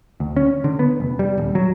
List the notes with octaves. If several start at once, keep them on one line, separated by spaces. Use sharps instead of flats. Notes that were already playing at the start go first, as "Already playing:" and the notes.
D2
C#4
D3
B3
F1
G3
D#1
F#3